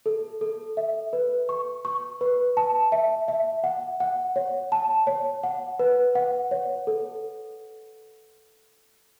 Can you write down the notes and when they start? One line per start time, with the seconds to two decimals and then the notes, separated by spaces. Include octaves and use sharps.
0.06 A4
0.41 A4
0.77 E5
1.13 B4
1.49 C#6
1.85 C#6
2.21 B4
2.57 A5
2.92 E5
3.28 E5
3.64 F#5
4.00 F#5
4.36 C#5
4.72 A5
5.07 C#5
5.43 F#5
5.79 B4
6.15 F#5
6.51 C#5
6.87 A4